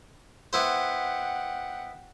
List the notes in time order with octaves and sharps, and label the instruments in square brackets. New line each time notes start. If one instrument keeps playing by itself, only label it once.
[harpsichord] B3 E4 C5 [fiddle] F#5 G5